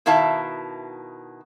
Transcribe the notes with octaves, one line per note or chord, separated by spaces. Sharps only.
B2 D#3 E4 E5 F5 A5